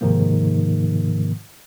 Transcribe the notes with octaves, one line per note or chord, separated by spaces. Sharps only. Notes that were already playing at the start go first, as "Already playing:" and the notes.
G#2 C3 D#3 F3 A#3